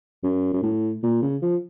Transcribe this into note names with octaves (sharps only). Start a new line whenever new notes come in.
F#2
F#2
A2
A#2
C#3
F3